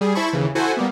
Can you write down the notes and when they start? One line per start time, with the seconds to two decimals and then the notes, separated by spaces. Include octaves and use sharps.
0.01 G3 G#4
0.15 E4 C5 A5 B5 C#6
0.33 D#2 C#3 E3
0.55 E4 F#4 A4 C5 F#5 G#5
0.77 G3 A#3 B3